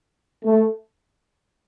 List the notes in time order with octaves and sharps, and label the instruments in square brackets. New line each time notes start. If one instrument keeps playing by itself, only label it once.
[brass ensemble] A3